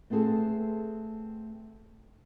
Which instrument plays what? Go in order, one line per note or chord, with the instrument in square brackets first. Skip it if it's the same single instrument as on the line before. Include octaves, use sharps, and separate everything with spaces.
[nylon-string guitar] A3 B3 C4 G#4 A4